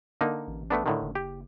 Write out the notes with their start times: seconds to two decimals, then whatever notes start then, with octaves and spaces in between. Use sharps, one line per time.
0.21 D3 A#3 D#4
0.47 A1
0.70 A3 B3 D4
0.86 A2 D3 D#3
1.02 F#1
1.15 G4